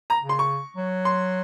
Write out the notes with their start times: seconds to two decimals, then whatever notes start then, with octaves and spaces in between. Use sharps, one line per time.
0.10 A#5
0.19 C#3
0.29 C6
0.39 C#6
0.76 F#3
1.05 C6